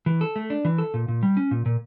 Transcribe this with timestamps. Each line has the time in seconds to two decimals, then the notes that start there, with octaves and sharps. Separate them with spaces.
0.06 E3
0.21 A4
0.36 A3
0.50 D4
0.65 E3
0.78 A4
0.94 A#2
1.08 A#2
1.23 G3
1.37 C#4
1.51 A#2
1.66 A#2